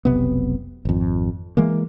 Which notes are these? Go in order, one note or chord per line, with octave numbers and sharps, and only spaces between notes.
F1 B1 C3 B3
G#1 F2
E3 G#3 A#3